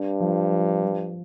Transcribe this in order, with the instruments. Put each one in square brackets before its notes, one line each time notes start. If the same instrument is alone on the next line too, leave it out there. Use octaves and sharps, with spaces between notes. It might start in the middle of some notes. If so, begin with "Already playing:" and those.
Already playing: [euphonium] G2 [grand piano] D4
[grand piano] F3
F3
F3